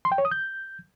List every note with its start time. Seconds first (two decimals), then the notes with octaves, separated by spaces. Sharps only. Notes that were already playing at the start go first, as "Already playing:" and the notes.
0.05 C6
0.12 G5
0.18 C#5
0.25 D#6
0.31 G6